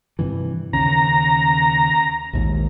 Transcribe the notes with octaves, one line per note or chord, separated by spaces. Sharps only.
G2 C3 E3
D#2 C#3 A#5
A#1 D#2 G#2